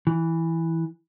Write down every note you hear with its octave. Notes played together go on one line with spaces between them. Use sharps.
E3